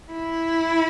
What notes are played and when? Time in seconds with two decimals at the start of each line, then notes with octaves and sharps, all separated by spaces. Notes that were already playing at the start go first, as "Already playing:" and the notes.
0.12 E4